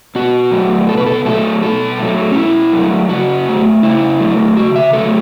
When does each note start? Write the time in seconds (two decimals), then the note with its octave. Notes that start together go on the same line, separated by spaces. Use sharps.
0.15 B2 F#4
0.52 F#3 A3
0.89 B2 A4
0.97 B4
1.06 A4
1.25 F#3 A3 A4
1.62 B2 A4
1.99 F#3 A3
2.32 C#4
2.36 B2 E4
2.73 F#3 A3
3.09 C#3 F#4
3.46 F#3 A3
3.83 C#3 E4
4.20 F#3 A3
4.57 C#3 F#4
4.76 E5
4.93 F#3 A3 A4